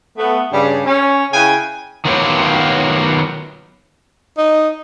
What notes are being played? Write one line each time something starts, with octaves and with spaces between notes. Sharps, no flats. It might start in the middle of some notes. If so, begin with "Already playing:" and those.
A3 B3
G2 C#3 G3
C#4
C#3 E4 G#4 B4 G5 G#5
D#3 F#3 B3 F4 G4 C#5
D#4